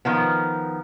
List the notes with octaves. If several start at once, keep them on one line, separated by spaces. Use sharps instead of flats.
D#3 F3 B3